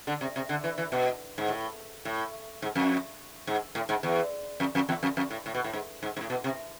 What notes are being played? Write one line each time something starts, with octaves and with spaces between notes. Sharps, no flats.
D3
C3
C3
D3
E3
E3
B2
G#2
A2
A2
G#2
F2
G#2
A2
G#2
E2
F2
F2
E2
F2
F2
A2
A2
B2
A2
G#2
G#2
G#2
A2
B2
C3